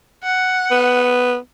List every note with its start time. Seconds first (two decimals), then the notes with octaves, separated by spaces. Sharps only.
0.23 F#5
0.71 B3